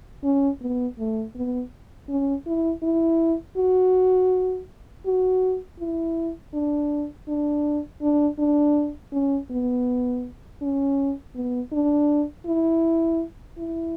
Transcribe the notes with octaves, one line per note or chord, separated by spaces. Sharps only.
C#4
B3
A3
B3
C#4
E4
E4
F#4
F#4
E4
D4
D4
D4
D4
C#4
B3
C#4
B3
D4
E4
E4